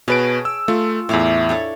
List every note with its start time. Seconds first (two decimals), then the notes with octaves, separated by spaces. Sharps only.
0.08 B2 G#4 B4 C#5 A5 D7
0.45 E6
0.68 A3 F4
1.09 E2 A2 E4 F5 D6
1.49 D4 A4 C#5